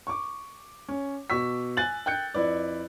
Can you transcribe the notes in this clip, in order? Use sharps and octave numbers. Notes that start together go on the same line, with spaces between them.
C#6 D6
C#4
B2 C#6 E6 B6
G#5 F#6 A6 F#7
G5 F#6 G6 C#7
F2 E4 B4 D5